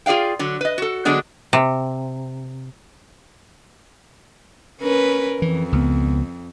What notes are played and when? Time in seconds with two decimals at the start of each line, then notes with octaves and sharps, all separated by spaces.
0.06 F4 G#4 D5 F5 G5
0.39 D3 F#3
0.61 B4 D#5
0.78 F#4 A4
1.05 D3 F#3 G#3 B3 D4
1.53 C3
4.81 C#4 A#4 B4
5.42 F2 E3
5.72 C#2 B3